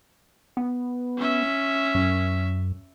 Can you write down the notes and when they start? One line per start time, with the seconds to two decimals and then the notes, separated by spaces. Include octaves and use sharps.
0.57 B3
1.17 C#4 E5
1.95 F#2